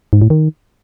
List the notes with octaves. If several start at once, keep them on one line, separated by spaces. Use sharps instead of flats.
G#2
A2
D#3